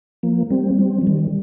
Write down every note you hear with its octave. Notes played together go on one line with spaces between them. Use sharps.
F3 A#3
G3 C4
G3 C4
F3
D#3 G3